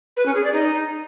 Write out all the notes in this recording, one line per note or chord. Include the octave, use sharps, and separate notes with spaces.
B4
C#4
G#4
D5
D#4